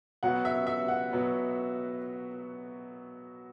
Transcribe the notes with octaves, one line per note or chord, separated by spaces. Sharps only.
B2 F#3 B3 F#5
E5
E5
F#5
B2 F#3 B3